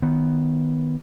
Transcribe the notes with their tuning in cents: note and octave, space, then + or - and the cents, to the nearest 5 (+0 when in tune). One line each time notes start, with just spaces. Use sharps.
D#3 +0 B3 +0